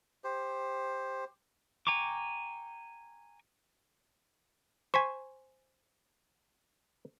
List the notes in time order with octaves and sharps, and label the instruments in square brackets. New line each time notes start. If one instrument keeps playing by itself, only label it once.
[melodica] G4 C5
[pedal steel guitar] G5 G#5 A#5 C#6 D6
[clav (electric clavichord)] C5 G#5 [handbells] C#6 B6